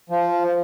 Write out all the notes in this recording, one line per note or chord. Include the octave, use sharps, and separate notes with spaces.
F3